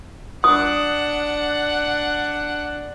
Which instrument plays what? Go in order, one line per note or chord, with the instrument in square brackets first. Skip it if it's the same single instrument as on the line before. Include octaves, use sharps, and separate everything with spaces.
[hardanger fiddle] D4 F#5 [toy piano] D#6